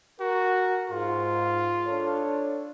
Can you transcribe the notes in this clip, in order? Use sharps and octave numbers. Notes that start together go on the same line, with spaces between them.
F#4 A#4
G#2 F4
D4 A4 C#5